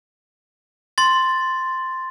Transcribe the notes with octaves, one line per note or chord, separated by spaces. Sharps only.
C6 A6